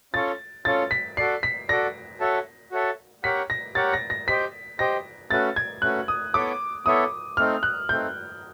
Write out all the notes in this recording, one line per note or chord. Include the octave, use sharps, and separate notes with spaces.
C#4 F4 A4 C#5 A6
C#4 F4 A4 C#5 A6
B6
F#4 A4 D5 C7
B6
F#4 A4 D5 A#6
F#4 A4 C#5 E5 A5
F#4 A4 C#5 E5 A5
G4 A#4 C#5 F#5 B6
A#6
G4 A#4 C#5 F#5 A6
A#6
A#6
G4 C5 D#5 G5 B6
G4 C5 D#5 G5 A#6
A3 C#4 F#4 B4 A6
G#6
A3 C#4 F#4 B4 F#6
D#6
B3 E4 A4 C#5 E5 D6
B3 E4 A4 C#5 E5 D#6
A3 C4 D#4 F6
F#6
A3 C4 D#4 G6